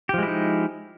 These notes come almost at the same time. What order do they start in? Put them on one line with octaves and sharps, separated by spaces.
G4 F3 G#3 E4 D#4